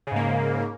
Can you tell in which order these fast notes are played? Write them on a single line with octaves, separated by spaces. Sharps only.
C#3 G#2 A#3